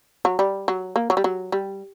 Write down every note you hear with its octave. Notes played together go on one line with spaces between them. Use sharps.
F#3
G3
F#3
A#3
F#3
G3
F#3
G3